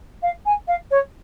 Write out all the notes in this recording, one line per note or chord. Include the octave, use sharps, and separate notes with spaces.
F5
G#5
F5
C#5